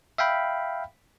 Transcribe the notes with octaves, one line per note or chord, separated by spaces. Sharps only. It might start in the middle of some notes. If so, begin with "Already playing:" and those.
E5 F5 G5 B5